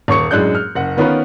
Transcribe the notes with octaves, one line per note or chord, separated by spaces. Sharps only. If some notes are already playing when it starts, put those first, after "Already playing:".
D#1 C#5 C#6 C#7
F#2 A2 G#3 D4 F#6 G6
F6
F#1 F#5
D#3 B3 C#4 F4 A#4 B4